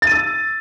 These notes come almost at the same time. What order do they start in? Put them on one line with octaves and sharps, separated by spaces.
A6 D#7 E6